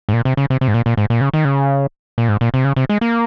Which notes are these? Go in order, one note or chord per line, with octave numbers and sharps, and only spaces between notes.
G#2
A#2
C3
C#3
C3
C3
G#2
A#2
A#2
G#2
A#2
C#3
D#3
C#3
A#2
G#2
A#2
C3
C#3
C3
G#3
A#3